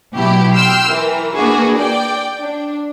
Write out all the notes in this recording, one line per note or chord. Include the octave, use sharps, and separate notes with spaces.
B2 F#3 E4 G4
G5 C6 E6 F6
E3 A#4
E3 A#3 D4 F#4 G#4
D5 G5
D4